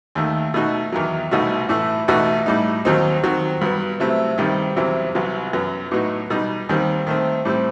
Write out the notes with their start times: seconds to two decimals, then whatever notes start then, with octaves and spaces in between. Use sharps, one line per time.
0.15 D#2 D#3 A3
0.54 B2 A3 D#4 F#4
0.92 E2 D#3 F#3
1.31 C2 B2 A3 D#4 F#4
1.69 A2 E3 A3
2.08 E2 B2 A3 D#4 F#4
2.46 A2 G3 D#4
2.85 D#2 D#3 F#3 C4 D#4
3.23 D#3 F#3 C4 F#4
3.61 G2 F#3 B3
4.00 C3 F#3 A3 C4 E4
4.38 G2 D#3 G3 C4
4.76 E2 C3 F#3 C4 E4
5.15 C2 C3 F#3 B3
5.53 F#2 F#3 B3
5.91 A2 F#3 B3 D#4 F#4
6.30 B2 G3 D#4
6.69 D#2 D#3 G3 C4
7.07 D#3 A3 C4
7.45 A2 G3 C4